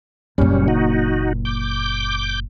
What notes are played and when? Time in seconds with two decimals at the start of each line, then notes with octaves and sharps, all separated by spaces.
0.38 F#1 F#2 A#2 G3 C#4
0.68 D#4 F#4
1.45 D6 G6